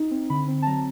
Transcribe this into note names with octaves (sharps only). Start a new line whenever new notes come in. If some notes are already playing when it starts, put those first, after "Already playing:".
Already playing: D#4
C4
D3 B5
C4
A5
F#3 A#5